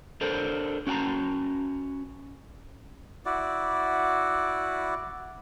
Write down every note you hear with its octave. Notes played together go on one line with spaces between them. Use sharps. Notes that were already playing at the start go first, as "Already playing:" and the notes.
D4 A4 A#4 C5
C#4 F#4 F#5 A5 A#5
E4 F#4 D5